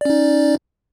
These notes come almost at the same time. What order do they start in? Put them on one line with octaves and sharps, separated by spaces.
D5 C#4 D#4